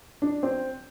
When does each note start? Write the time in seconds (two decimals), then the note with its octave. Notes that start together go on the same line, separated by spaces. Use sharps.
0.22 D4
0.43 C4